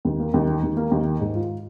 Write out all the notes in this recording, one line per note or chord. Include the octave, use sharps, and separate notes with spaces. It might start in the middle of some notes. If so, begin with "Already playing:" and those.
D#2
A#3
D#2
D#3
D#2
A#3
D#2
D#3
G#2
F4